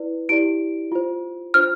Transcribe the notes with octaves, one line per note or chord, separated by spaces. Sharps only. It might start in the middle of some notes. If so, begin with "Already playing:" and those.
Already playing: E4 B4 D5
E4 G4 D5 D7
F4 C5
D4 F4 C5 F6